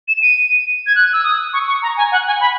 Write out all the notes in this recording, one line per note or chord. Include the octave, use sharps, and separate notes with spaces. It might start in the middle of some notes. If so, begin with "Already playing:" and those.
E7
D#7
G#6
F#6
E6
D#6
C#6
C#6
A#5
G#5
F#5
G#5
B5